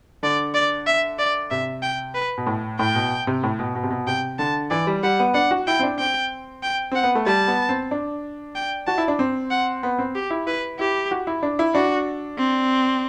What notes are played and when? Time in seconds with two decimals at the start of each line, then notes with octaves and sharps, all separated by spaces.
0.23 D3 D5
0.54 D5
0.87 E5
1.19 D5
1.51 C3 E5
1.83 G5
2.15 B4
2.38 B2
2.47 A2
2.79 A2 G5
2.95 B2
3.27 C3
3.43 A2
3.59 B2
3.75 B2
3.83 C3
3.90 B2
4.07 C3 G5
4.39 D3 A5
4.71 E3 D5
4.87 G3
5.03 G3 F#5
5.20 B3
5.34 D4 F#5
5.51 F#4
5.67 E4 G5
5.79 C4
5.83 D4
5.99 C4 G5
6.63 G5
6.92 C4 F#5
7.04 B3
7.15 A3
7.26 G3 A5
7.48 B3
7.69 C4
7.91 D4
8.55 G5
8.87 F#4 A5
8.98 E4
9.08 D4
9.19 C4
9.51 F#5
9.83 B3
9.99 C4
10.15 G4
10.30 E4
10.47 E4 B4
10.79 E4 G4
11.11 F#4
11.27 E4
11.43 D4
11.59 E4
11.75 D4 F#4
12.39 C4